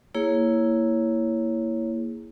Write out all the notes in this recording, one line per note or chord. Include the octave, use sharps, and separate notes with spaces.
A#3 E4 G#4 C#5